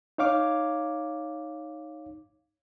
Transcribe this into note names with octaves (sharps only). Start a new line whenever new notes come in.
D#4 C#5 F5 D6